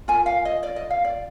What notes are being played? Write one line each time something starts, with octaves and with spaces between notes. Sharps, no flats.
F4 A#4 G#5
F5
D#5
D5
D#5
F5
D5